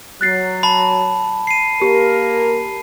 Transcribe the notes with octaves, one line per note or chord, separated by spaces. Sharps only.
F#3 F#6 A6 C7
A5 B5
C7 D#7
A#3 G4 A#4